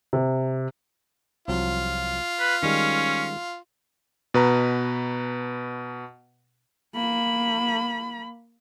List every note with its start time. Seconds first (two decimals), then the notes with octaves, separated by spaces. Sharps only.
0.13 C3
1.48 C2 F3 F#3 F4
2.40 B4
2.63 D#3 G3 G#3 C#4
4.34 B2 B4 A#5
6.95 A#3 B5